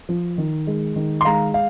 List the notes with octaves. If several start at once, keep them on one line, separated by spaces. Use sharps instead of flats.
F3
D#3
G#3
D#3
C6
G#3 F5 A#5
F5